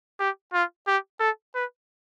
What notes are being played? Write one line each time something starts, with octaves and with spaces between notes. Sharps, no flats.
G4
F4
G4
A4
B4